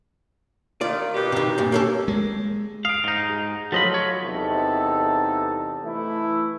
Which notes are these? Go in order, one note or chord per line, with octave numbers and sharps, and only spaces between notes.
D#3 F4 D5
B2 G4
C3 D#3
G2 A#2
A#3 C#4 A4
G#3
F5 D#6 D7
G#2 D#4
G#4
F3 F#3 A3 F4 D#5 B5
C#5
E2 C3 D#4 A4
E3 A3 E4